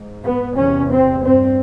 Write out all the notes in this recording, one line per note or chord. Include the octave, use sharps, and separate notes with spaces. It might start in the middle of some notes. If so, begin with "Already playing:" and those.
Already playing: G#2
B3
E2 C3 C#4
C4
G2 C4